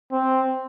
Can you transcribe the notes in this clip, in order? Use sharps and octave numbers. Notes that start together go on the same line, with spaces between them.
C4